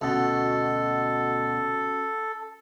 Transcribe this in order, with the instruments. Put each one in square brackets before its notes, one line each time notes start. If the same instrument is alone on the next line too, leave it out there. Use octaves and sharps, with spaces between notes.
[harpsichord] D2 B2 [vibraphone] C#4 F#4 F#5 [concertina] A4